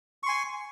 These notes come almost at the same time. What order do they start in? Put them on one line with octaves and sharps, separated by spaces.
C#6 C6 G#5